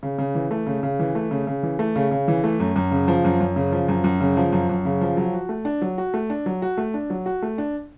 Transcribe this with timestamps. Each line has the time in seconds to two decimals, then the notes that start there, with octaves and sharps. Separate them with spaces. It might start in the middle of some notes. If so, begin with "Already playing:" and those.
0.03 C#3
0.19 C#3
0.35 E3
0.51 A3
0.67 C#3
0.83 C#3
0.99 E3
1.15 A3
1.31 C#3
1.47 C#3
1.63 E3
1.79 A3
1.96 C#3
2.11 C#3
2.28 E3
2.44 A3
2.60 F#2
2.76 F#2
2.91 C#3
3.08 F3
3.24 F#2
3.40 F#2
3.56 C#3
3.72 F3
3.88 F#2
4.04 F#2
4.21 C#3
4.37 F3
4.52 F#2
4.69 F#2
4.85 C#3
5.01 F3
5.17 F#3
5.34 F#4
5.49 A3
5.65 D4
5.82 F#3
5.98 F#4
6.14 A3
6.30 D4
6.46 F#3
6.62 F#4
6.78 A3
6.94 D4
7.10 F#3
7.26 F#4
7.42 A3
7.58 D4